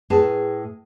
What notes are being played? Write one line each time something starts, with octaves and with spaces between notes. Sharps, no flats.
A2 G#4 B4 A5